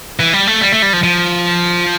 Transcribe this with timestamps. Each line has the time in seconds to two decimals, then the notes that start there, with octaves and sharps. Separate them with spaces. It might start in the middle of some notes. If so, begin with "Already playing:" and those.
0.19 E3
0.33 G3
0.47 A3
0.61 G3
0.72 A3
0.82 G3
0.93 F3
1.04 F3